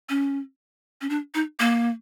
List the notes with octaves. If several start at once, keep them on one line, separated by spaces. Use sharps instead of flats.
C#4
C#4
D4
D#4
A#3